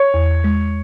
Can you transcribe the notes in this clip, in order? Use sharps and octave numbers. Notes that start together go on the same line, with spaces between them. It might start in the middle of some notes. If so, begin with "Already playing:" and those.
Already playing: C#5
E2
G#3